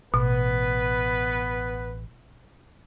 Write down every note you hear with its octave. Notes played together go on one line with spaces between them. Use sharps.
A1 B2 B3 B4